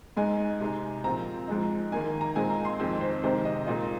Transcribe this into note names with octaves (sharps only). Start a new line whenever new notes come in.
G#2 G#3 D#4 G#5
C3 G#3 D#4
A#2 F3 C4 A#5
G#2 F3 G#3 D#4
D#3 A#3 D#4 G#5
A#5
A#2 G#3 C4 D#4 G#5
A#5
C6
F2 D#3 G#3 C4 C5
C5
C3 D#3 G#3 C4 D#4 C5
D#5
A#2 G#3 D#4 D#5